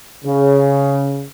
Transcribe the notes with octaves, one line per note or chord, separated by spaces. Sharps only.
C#3